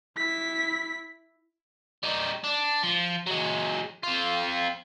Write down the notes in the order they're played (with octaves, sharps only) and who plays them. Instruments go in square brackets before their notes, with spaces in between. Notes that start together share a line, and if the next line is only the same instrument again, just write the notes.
[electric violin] E4 B6
[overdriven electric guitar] G3 D#4
D4
F3
F#3 G#3
C4 F4